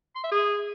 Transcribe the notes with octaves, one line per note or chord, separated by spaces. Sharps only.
C6
E5
G#4